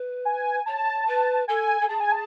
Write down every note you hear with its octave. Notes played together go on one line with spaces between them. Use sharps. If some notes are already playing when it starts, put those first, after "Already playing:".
Already playing: B4
G#5
C#5 A5
B4
A4 G#5
A4
G#4 A5
G#5
A5